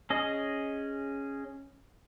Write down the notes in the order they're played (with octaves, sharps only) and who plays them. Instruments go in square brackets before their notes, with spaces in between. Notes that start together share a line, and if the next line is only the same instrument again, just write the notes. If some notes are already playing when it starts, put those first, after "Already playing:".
[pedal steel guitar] C#4 G#4 D#5